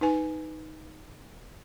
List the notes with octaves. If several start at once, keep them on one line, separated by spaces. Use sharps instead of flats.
D#4 B4 G#5